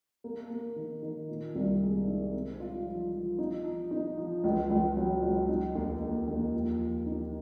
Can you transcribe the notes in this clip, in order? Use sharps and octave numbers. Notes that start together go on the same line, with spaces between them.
A#3
A#3
D#3
D#3
A#2
C2
G#3
D#4
C4
F4
F3
F3
D#4
F3
D#4
F3
C#2
C#2
F#3
C#2
D#4
D#2
D#2
D#2
F3
F3
D#4